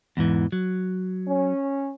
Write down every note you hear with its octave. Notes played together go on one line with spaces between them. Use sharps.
E2 G#2 E3
F#3
C#4